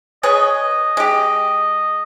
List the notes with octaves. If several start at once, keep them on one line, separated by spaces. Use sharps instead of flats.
G#4 B4 C#5 D#5
G#3 G4